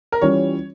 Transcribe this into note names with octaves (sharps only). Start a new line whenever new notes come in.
A#4
E3 G3 C#4 F4 C#5